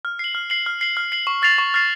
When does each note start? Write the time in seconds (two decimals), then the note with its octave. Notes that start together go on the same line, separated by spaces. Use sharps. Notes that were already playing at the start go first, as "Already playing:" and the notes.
0.05 F6
0.19 C7 F#7
0.35 F6
0.50 C7 F#7
0.66 F6
0.81 C7 F#7
0.97 F6
1.12 C7 F#7
1.27 C#6
1.42 F6 A6 C7 F7
1.58 C#6
1.74 F6 A6 C7 F7